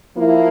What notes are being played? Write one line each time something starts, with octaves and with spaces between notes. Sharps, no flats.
F3 A#3 E4